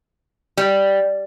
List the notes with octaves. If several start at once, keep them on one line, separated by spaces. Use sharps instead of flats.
G3